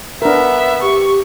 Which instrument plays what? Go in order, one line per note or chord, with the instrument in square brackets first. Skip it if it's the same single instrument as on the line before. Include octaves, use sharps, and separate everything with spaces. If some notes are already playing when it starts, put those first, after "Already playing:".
[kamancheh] B3 E5 [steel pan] D4 A#4
[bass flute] G4 [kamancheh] C#6